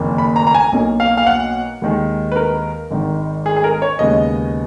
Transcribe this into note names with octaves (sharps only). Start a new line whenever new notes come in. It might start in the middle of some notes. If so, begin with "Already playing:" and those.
Already playing: F#1 F2 D#3 A#3
B5
A#5
A#5
G#5
B1 B2 A#3
F5
F5
F#5
D#2 D#3 G#3
B4
A#4
G#1 G#2 D#3
G#4
G#4
A#4
C#5
D#2 C#3 G#3 B3 D#5